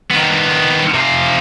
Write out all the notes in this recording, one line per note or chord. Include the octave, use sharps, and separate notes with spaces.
D#3 B3
C3 F5